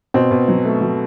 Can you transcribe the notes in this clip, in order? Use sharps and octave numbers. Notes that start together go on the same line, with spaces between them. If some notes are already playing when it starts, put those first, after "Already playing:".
B2 C4
B2
F#3
A3
F#3